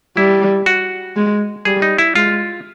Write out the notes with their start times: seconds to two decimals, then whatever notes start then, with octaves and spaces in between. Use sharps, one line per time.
0.17 G3 E4
0.66 F#4
1.16 G#3
1.65 G3 G#4
1.82 D#4
1.98 E4
2.15 G#3 F4